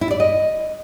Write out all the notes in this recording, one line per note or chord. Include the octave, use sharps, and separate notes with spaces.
E4
D5
D#5